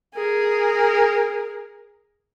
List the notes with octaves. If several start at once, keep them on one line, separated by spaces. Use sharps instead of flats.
G#4 A#4